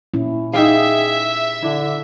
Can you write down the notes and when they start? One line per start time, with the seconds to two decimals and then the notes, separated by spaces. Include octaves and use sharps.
0.14 A#2 C#4 E4
0.53 D#4 G4 G#4 E5 F5
1.63 D3 D4 E4